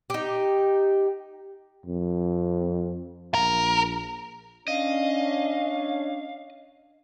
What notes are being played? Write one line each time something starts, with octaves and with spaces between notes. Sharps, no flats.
D#4 G4
F2
A#1 A#4
C#4 D4 D#5 F5